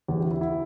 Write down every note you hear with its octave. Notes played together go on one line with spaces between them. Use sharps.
E2 G4
E3 G4
E4
E4